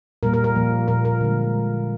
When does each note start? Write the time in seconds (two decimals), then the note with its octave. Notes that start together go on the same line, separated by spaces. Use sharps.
0.23 A#2 G3 A#3 A#4
0.34 A#4
0.44 A#4
0.56 A#2 F3 A#3
0.88 A#2 F3 A#3 A#4
1.05 A#4
1.21 D3 G#3